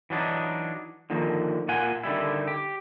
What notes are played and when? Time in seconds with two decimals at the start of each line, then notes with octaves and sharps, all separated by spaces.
0.10 E3 F#3 D4 D#4
1.10 D3 D#3 F3 A#3
1.68 A#2 A#3 F4 F#5 G#5
2.03 D3 D#3 G3 E4
2.48 G4